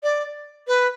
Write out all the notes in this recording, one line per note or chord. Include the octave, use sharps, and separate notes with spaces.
D5
B4